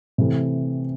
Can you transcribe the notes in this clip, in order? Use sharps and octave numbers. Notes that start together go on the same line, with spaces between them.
C3 E3 A3